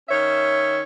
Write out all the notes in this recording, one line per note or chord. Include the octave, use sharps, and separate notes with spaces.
D#3 C#4 C#5 E5